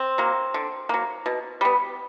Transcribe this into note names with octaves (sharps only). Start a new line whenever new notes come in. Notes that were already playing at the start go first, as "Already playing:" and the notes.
Already playing: C4
F#3 A#3
D3
F#3 A#3
B2
G3 B3